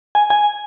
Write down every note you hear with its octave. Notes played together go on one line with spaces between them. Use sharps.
G#5
G#5